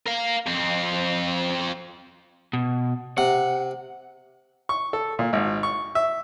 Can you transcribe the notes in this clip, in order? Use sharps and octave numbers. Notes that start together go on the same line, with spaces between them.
A#4 F5
F2 C4
B2
C3 F#5
C#6
A4
A#2
G#1
C#6
E5